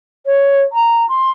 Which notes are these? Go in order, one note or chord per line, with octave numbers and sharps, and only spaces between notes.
C#5
A#5
C6